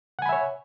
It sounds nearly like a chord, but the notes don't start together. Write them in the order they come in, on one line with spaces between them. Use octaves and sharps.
F#5 G#5 B5 E5 C#5